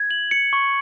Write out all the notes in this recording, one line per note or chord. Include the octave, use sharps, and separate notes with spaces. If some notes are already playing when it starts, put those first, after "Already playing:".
Already playing: G#6
F#7
C#7
C#6